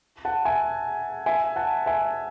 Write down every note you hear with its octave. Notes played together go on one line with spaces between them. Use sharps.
F#5 A5
E5 G#5
E5 G#5
F#5 A5
E5 G#5